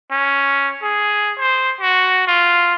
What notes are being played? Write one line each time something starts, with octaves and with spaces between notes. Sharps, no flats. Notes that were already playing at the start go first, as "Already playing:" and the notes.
C#4
G#4
C5
F#4
F4